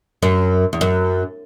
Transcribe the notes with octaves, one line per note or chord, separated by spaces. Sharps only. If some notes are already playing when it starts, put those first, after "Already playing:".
F#2
E2
F#2